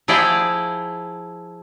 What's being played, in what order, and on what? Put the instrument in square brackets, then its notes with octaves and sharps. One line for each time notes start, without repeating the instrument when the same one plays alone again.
[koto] F3 E4 G#4 D5 G5 A#5